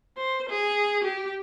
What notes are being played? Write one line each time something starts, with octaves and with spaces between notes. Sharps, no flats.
C5
G#4
G4